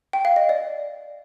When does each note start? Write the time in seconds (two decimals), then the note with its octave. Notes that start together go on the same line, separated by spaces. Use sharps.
0.13 G5
0.25 F5
0.36 D#5
0.49 D5